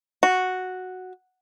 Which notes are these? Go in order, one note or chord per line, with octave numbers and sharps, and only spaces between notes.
F#4